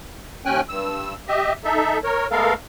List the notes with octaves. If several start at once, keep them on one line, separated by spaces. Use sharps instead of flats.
D#2 C#4 G5 G#5 F#6
G2 E6
G4 D#5 E5
D#4 A4 E5
A#4 C#5
G#3 A3 B3 A4 A#4 F5